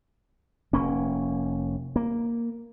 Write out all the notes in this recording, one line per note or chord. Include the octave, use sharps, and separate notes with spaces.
F1 A#3 C#4
A#3